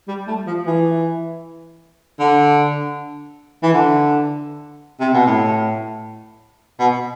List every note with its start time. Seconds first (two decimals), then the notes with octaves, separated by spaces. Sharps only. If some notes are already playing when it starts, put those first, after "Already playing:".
0.08 G3
0.28 A3
0.47 F3
0.66 E3
2.20 D3
3.63 E3
3.73 D3
5.00 C3
5.14 B2
5.26 A2
6.80 B2